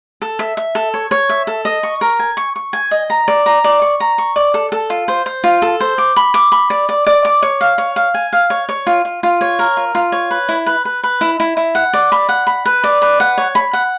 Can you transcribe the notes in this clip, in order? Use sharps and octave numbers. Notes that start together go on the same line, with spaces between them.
A4
E5
E5
A4
C#5
C#5
E5
A4
D#5
C#6
A#4
G#5
C#6
C#6
G#5
D#5
A#5
D5
A#5
D5
C#6
A#5
C#6
D5
A4
A4
F4
C5
C5
F4
A4
C5
D6
B5
D6
B5
D5
D5
D5
D6
C#5
F5
C#5
F5
G#5
F5
C#5
C#5
F4
F4
F4
C#5
A#4
F4
F4
C#5
B4
E4
B4
B4
B4
E4
E4
E4
F#5
D5
B5
F#5
B5
B4
D5
B4
F#5
C#5
B5
F#5